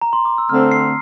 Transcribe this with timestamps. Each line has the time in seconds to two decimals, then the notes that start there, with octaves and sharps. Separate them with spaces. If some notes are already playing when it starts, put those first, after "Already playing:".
0.02 A#5
0.13 C6
0.25 D6
0.38 E6
0.49 D3 A3 C4 F6
0.72 C7